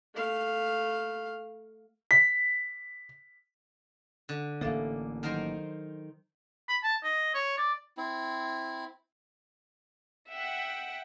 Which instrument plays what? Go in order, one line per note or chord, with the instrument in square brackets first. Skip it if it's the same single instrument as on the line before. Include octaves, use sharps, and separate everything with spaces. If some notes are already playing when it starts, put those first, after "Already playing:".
[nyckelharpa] A3 F5
[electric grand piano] B6
[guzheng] D3
[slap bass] A1 A#3 [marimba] A4 E5 F5
[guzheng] D#3 A#4 C5 [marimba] F#3 D#5 F#5
[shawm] B5
A5
D#5
C#5
D5
[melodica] C4 E4
[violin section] E5 F#5 G5